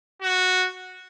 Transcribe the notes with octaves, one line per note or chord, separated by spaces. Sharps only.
F#4